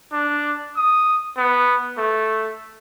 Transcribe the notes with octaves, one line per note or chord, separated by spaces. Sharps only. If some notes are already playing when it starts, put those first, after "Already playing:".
D4
D#6
B3
A3